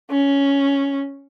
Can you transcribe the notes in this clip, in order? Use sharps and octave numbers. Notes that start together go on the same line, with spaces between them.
C#4